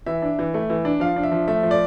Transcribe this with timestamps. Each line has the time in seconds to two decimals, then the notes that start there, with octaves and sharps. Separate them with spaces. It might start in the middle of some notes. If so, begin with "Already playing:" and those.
0.06 E3 E5
0.22 D4
0.39 E3
0.54 A3
0.70 E3
0.85 D4
1.00 F3 F5
1.16 D4
1.23 E5
1.32 F3
1.48 A3 E5
1.63 F3
1.71 D5